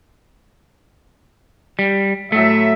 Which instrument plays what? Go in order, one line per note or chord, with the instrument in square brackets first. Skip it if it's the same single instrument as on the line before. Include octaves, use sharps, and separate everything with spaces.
[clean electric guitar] G3
[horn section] A2 F#3 E5 [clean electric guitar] A3